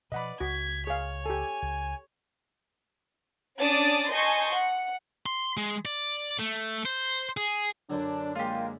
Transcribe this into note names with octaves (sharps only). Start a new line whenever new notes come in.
B2 F3 B4 D5 D#5 F#5 B5
C#2 F#4 G#6 B6
G#4 C#5 F5
G4 A4 G#5
C#2
C#4 D4 D5 A5 D#6 A6
D#5 G#5 A5 C6 C#6 G6
F#5
C6
G#3
D5
A3
C5
G#4
F#2 D3 F#3 D4
G#3 A#3 F4 G4